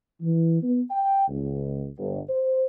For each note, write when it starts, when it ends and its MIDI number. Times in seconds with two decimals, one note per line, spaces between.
0.21 0.58 52
0.62 0.81 59
0.91 1.25 79
1.28 1.87 37
1.98 2.19 31
2.29 2.65 72